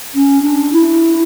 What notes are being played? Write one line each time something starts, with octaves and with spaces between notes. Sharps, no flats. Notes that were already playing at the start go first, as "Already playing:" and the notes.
C#4
D4
E4